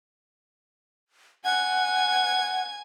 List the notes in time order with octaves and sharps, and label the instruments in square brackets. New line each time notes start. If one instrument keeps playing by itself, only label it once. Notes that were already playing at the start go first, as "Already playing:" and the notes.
[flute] F#5 [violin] G#5 G#6